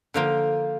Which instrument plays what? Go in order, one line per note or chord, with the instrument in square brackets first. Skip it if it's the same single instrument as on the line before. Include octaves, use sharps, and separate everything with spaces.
[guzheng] D3 F3 A#3 F4